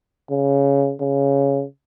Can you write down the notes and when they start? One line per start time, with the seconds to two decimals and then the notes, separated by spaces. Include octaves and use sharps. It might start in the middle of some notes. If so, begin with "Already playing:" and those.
0.30 C#3
1.01 C#3